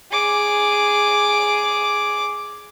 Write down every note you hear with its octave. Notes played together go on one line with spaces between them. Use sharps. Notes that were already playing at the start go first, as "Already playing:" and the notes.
G#4 D6